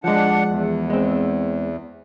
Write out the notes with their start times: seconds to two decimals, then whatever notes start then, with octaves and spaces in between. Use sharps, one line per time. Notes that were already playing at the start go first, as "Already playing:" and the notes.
0.04 F3 G#3 D4 F#5
0.47 E2
0.90 G#3 C4